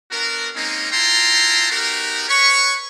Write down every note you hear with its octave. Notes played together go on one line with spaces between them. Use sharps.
B3 D4 F#4 A#4
G#3 A#3 C4 C#4 D#4
E4 F4 G5 A5 A#5 C6
B3 D#4 F#4 G4 A#4
B4 C#5 C#6